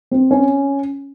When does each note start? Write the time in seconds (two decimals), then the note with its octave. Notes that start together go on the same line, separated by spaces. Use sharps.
0.11 C4
0.31 C#4